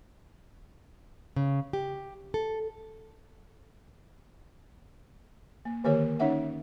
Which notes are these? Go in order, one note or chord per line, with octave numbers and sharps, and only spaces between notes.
C#3
G4
A4
A#3
D3 D#3 A#3 G4 A#4 C#5
C#4 D#4 C#5 E5 F#5